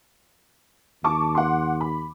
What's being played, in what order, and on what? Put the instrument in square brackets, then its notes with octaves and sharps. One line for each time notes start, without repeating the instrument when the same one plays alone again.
[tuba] D#2 [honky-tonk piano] A5 C#6 D6
[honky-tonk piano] F#5 C6
B5